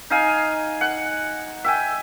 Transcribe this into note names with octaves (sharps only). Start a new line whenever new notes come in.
D#4 F5 G#5
F#5
E5 G5 G#5